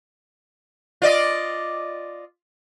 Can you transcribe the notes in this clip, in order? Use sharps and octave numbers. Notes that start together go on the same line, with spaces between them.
F4 D5 D#5